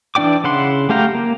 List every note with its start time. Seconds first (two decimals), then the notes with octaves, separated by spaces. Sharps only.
0.15 E3 D4 D5 G5 D6
0.44 C#3 E4 F#5 C6
0.89 A3 G4 F5 G5 A#5
1.15 A#3